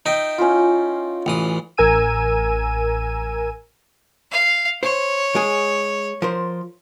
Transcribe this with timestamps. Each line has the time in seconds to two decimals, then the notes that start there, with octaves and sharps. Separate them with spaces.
0.06 D#4 D#5 E5 G5
0.38 C#4 E4 F4
1.26 A1 E3 D#6
1.77 A1 A#4 G#5 E6 D#7
4.31 F5
4.83 C5 C#5
5.35 G#3 G#4
6.22 F3 A#4 C5